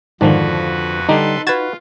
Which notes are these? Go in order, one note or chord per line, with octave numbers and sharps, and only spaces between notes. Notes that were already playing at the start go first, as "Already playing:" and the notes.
F2 G#2 D3 D#3 F3 D4 F#4 B4
D3 G3 D4 D#4 A4 B4 C6
F4 F#4 B4 G#6 A6 E7